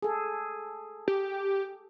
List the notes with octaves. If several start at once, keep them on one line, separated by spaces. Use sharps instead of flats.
G#4 A4
G4